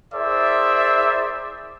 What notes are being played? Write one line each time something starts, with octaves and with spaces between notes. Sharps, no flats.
E4 G#4 A#4 C5 D5 E5